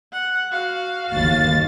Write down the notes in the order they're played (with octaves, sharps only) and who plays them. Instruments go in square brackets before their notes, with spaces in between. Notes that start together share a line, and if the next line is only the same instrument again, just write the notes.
[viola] F#5
F#4 F5
[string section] G1 D#2 A6